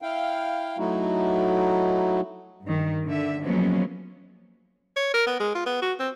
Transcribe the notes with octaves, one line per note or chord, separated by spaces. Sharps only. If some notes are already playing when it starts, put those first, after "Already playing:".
E4 F5 G5
F#3 A3 D#4 E4 F#4
G2 D#3
D3 E5
F3 F#3 G#3 A#3 B3 C#4
C#5
A#4
B3
G#3
F4
B3
F#4
C4